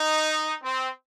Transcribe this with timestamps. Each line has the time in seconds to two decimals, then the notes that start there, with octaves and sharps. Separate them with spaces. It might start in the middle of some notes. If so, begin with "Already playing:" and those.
Already playing: D#4
0.61 C4